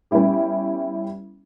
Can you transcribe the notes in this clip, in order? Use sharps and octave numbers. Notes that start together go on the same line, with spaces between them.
G3 B3 C#4 E4 G4